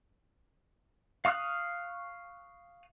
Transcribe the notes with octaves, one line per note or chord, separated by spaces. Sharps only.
F5 C#6 D#6 F6 F#6